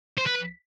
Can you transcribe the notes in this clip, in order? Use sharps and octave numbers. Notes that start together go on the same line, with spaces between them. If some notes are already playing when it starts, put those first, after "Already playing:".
C5
B4